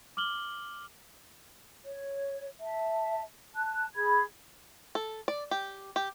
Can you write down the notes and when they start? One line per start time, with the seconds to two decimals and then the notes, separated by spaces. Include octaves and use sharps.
0.17 D6 F6 F#7 G7
1.84 C#5
2.61 E5 A5
3.55 A5 F#6
3.96 G#4 B5 G#6
4.95 A4
5.28 D5
5.51 G4
5.96 G4